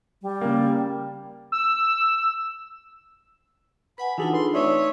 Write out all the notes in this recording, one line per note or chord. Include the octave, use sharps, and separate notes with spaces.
G3
C#3 A#3
E6
B4 F#5 G#5 B5
E3 D4 D#4 F4 F#4 G#4 A4
B4 C6
A3 C4 D#4 C#5 D5 E5